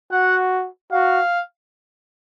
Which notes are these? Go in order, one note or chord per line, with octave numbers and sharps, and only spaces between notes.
F#4 F#5
F#4 F5